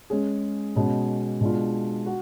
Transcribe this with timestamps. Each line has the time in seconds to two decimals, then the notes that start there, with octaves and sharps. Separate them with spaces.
0.10 G#3 C#4 G#4
0.75 B2 G#3 C#4
1.41 B2 G#3 D4 F4
2.06 F#4